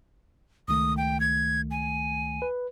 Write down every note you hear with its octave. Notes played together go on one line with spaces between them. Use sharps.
C#2 D#3 A3 D#6
G5
G#6
G#5
B4